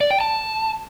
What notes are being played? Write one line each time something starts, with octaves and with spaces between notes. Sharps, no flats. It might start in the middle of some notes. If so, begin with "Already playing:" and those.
D5
G5
A5